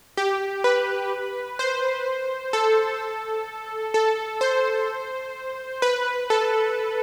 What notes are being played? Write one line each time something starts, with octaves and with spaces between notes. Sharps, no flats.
G4
B4
C5
A4
A4
C5
B4
A4